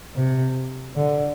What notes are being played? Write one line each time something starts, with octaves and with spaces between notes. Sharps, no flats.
C3
D3